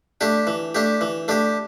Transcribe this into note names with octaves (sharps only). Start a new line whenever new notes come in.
A3 D4 G4
E3
A3 D4 G4
E3
A3 D4 G4